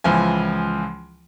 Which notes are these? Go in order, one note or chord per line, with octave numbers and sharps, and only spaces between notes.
C#2 E3 F3 G#5